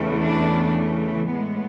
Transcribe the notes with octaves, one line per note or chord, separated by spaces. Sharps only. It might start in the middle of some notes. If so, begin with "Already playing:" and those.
Already playing: E2 C#3 E3 A3
D4
A2 G#3 B3